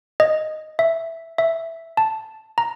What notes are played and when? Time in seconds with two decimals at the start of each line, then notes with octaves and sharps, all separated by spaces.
0.20 D#5
0.79 E5
1.38 E5
1.97 A5
2.58 A#5